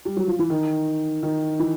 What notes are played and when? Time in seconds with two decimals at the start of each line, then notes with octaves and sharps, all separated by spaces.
0.05 G3
0.16 F#3
0.28 F3
0.39 E3
0.50 D#3
1.23 D#3
1.59 E3